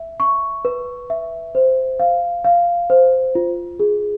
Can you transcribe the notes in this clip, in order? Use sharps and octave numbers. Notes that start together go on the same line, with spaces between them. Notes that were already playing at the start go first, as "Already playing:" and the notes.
Already playing: E5
C#6
B4
E5
C5
F5
F5
C5
F4
G#4